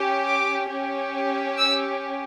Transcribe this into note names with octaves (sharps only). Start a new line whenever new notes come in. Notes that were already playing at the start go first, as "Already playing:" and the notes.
Already playing: C#4 G4
D6
C#4 G4
E6